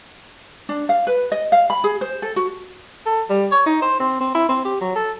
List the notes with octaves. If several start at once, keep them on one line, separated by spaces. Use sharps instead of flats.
D4
F5
B4
D#5
F5
B5
G#4
C5
A4
F#4
A4
G3
C#5
D#4
C5
C4
C4
E4
C4
G4
F#3
A4